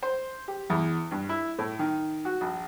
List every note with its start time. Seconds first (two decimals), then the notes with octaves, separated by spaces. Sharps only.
0.03 C5
0.48 G4
0.70 E2
1.11 G2
1.29 E4
1.59 A2
1.79 D#3
2.25 F#4
2.41 A#1